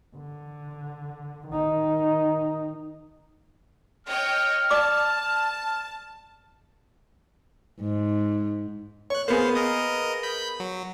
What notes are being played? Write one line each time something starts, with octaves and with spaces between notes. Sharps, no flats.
D3
D#3 D#4
C#5 D#5 G5 F6
D5 A5 D6
G#2
C#5 C#6 F#6
A#3 B3 G#4 C5 F5
A#4 D#5 D#6
B5 G6
F#3